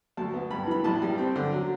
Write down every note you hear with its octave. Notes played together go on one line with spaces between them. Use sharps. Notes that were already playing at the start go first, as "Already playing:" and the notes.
D2 A5
B3
G2 B5
E3 B5
A1 A5
G3
C4
D3
F#3